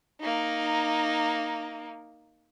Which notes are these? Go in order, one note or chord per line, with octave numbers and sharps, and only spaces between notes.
A#3 D#4